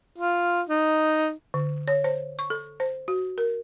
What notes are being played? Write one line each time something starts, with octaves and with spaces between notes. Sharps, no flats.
F4
D#4
D3
C#5
C5
C#6
A4
C5
F#4
A#4